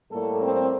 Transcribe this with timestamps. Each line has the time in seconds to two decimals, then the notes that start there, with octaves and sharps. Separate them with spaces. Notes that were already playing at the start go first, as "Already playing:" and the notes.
0.11 A2 G3 A#3 A4
0.41 C4